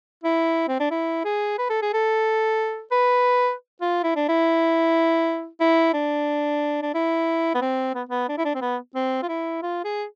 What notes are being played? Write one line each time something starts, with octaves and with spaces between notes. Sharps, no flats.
E4
C4
D4
E4
G#4
B4
A4
G#4
A4
B4
F4
E4
D4
E4
E4
D4
D4
E4
B3
C4
B3
B3
D4
E4
D4
C4
B3
C4
F4
E4
F4
G#4